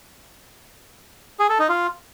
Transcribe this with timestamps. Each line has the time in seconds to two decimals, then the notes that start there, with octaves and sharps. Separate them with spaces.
1.40 G#4
1.49 A4
1.59 D#4
1.69 F4